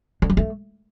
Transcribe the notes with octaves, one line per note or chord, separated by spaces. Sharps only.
D3
F#3
A3